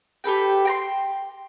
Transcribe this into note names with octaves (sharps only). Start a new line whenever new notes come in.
G4 A4 B4 G5
G5 A#5 C6